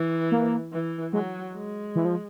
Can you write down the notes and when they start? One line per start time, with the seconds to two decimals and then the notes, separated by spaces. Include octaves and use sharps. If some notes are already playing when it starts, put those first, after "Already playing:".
Already playing: E3
0.32 A#3
0.73 E3
1.13 F#3 G#3
1.54 G#3
1.95 E3
2.05 F3